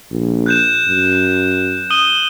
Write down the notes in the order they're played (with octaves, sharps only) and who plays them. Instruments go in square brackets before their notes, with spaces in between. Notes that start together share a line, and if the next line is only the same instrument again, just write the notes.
[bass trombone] A#1
[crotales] F#6 G6 E7
[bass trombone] F#2
[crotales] D#6 D#7 G7